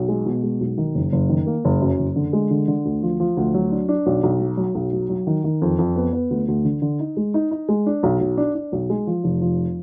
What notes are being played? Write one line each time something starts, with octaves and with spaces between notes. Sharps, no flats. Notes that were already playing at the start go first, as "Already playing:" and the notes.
Already playing: B1
G#3
B2
G#3
B1
D#3
F#1
F#1
D#3
A#3
F#1
F#2
F#1
D3
G#3
D3
D3
D2
F3
F3
D2
F#3
D4
D4
B1
B1
F#3
F#3
B1
F#3
F#3
D#3
D#3
F2
F2
B3
B3
D2
D2
D3
D3
D#4
G#3
D#4
D#4
G#3
D4
B1
B1
D4
D4
B1
G#3
F3
F1
F3